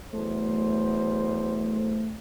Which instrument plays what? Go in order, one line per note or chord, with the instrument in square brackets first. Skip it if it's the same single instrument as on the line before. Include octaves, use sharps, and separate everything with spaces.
[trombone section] E2 F#3 C5 [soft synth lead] A3